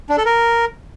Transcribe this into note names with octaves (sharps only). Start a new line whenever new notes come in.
D4
A4
A#4